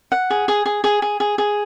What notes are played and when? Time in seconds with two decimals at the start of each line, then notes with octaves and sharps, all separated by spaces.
0.12 F#5
0.30 G#4
0.48 G#4
0.66 G#4
0.84 G#4
1.02 G#4
1.20 G#4
1.38 G#4